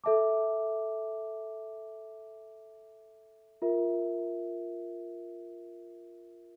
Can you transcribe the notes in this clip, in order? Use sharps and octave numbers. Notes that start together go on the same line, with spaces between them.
A4 E5 A5 D6
F4 A#4 E5